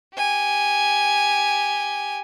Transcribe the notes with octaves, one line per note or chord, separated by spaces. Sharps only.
G4 G#5